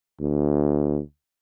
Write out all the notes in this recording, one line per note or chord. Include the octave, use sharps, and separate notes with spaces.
D2